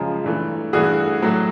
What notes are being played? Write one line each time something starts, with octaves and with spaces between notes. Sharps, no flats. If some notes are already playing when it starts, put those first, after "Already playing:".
Already playing: F#2 C#3 F3 G#3
G2 E3 A3
G2 E3 A3 F#4 G#4
A2 F#3 A3